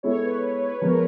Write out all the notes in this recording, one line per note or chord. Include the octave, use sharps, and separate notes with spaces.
G#3 B3 E4 A4 C#5
B4
B4
F3 G#3 B3 A#4